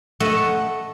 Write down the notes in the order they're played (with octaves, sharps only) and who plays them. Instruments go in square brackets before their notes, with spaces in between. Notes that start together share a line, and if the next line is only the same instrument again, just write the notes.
[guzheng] A3 A4 D#5 F#5 A5